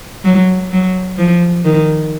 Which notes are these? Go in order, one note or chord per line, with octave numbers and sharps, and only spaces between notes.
F#3
F#3
F3
D#3